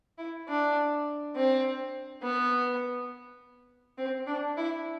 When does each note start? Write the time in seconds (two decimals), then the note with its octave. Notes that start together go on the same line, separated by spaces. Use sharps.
0.18 E4
0.48 D4
1.36 C4
2.23 B3
3.98 C4
4.27 D4
4.57 E4